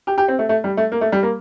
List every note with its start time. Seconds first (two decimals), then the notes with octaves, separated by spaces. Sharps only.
0.07 G4
0.18 G4
0.28 C4
0.39 A3
0.49 A3
0.64 G3
0.77 A3
0.92 A#3
1.01 A3
1.12 G3
1.23 A#3